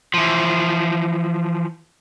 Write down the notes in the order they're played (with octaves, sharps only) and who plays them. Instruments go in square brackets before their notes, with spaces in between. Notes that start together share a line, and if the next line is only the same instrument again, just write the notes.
[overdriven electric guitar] E3 F3